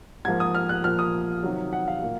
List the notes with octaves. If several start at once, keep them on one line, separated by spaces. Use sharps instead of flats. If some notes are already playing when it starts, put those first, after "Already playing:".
G#2 F3 A#3 G#6
D#6
F6
F#6
A#2 F3 A#3 F6
D#6
C3 D#3 F#3
F#5
F5
A#2 F#3 A#3